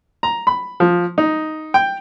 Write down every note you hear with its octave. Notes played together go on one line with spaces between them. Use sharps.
A#5
B5
F3
D#4
G5